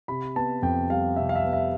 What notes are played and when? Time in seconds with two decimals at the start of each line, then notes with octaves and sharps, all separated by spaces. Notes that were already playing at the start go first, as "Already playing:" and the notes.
0.08 C3 B5
0.36 B3 A5
0.62 F2 G5
0.90 G3 F5
1.16 C3 E5
1.29 F5
1.35 E5
1.44 B3
1.53 E5